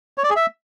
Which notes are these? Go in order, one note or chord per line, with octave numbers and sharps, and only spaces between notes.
C#5
D5
G#4
E5